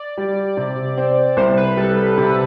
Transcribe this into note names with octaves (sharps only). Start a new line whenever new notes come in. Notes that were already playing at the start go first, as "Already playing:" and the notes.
Already playing: D5
G3
C3
C4
C2 C5
B4
G3 A4
C3 B4
B4